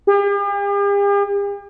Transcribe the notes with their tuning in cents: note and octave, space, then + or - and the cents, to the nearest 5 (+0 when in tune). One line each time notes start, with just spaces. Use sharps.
G4 +45